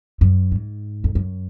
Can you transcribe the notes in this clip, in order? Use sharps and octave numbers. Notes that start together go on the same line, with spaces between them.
F#2
G#2
F2
F#2